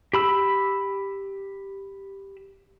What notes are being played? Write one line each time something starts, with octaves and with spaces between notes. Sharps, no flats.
G4 B5 E6